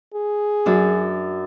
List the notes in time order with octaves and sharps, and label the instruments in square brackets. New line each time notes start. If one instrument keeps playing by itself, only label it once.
[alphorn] G#4
[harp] F#2 D4